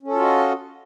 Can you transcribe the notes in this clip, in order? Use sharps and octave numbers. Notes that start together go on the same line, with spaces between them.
C#4 F4 F#4 A4 D#5